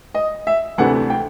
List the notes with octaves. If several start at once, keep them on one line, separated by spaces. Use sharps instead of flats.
D#5
E5
D2 C3 E3 A3 D4 F#5
G5